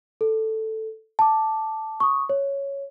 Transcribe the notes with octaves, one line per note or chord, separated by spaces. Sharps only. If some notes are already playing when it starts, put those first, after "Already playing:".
A4
A5 D6
C#6 D#6
C#5